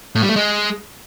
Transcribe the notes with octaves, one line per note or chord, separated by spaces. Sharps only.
A2
G3
A3
G#3